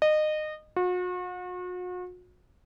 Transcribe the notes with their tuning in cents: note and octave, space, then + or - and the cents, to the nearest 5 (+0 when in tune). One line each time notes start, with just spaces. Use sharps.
D#5 -25
F#4 -40